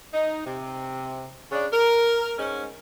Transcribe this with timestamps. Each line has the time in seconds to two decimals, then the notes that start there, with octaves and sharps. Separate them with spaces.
0.14 D#4
0.45 C3
1.52 C#3 D4
1.72 A#4
2.39 G#2 C#4